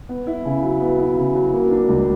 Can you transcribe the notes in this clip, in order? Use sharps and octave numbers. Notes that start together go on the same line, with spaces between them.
B3
E4
C#3
F#3
B3
E4
C#3
F#3
A#3
D4
C#2